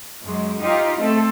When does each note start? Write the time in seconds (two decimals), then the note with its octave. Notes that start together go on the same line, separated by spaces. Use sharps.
0.23 F#2 G#3
0.61 D#4 F4 G4 D#5
0.99 A3 C4 A4